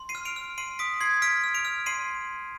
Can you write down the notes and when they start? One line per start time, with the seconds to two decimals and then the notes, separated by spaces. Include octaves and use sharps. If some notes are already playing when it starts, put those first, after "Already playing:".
Already playing: C6
0.09 C7 D#7
0.15 F6
0.25 D7 F7
0.36 F6
0.58 C6 C7 D#7
0.79 D#6 B6 D7
1.01 C6 G#6 C7
1.22 F6 B6 D7
1.44 F6
1.54 D7 F7
1.65 F6
1.86 C6 C7 D#7